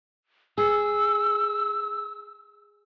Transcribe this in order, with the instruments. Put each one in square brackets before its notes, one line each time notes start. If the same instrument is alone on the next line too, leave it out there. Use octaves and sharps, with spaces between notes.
[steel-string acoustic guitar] G#4 [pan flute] E6